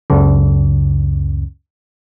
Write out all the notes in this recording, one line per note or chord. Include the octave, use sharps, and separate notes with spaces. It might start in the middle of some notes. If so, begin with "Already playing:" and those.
C#2 F#2 C#3